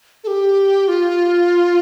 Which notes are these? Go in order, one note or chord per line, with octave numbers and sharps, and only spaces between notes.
A4
G4
F4